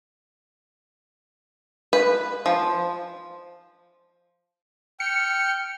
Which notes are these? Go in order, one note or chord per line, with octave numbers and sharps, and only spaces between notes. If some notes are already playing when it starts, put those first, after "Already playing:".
B4
F3
G5 F6 C#7